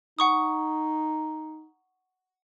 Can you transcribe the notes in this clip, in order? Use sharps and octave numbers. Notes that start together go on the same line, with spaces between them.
D#4 F#5 C#6 D#6